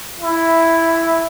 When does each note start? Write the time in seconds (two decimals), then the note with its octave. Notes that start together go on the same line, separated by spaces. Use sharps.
0.21 E4